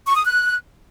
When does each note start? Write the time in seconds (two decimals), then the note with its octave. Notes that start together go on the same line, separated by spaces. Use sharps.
0.06 C#6
0.16 D#6
0.25 F#6